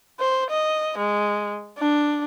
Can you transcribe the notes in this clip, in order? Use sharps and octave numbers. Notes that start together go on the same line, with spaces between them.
C5
D#5
G#3
D4